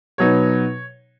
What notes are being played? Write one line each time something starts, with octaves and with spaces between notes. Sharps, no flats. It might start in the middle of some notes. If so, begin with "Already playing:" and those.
B2 F#3 B3 D#4 C#5